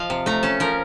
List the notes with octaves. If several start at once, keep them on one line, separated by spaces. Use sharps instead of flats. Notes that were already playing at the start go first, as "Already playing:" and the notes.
Already playing: F3 D#5 F5
C3
A3 A#5
C#4 A5
F3 A#4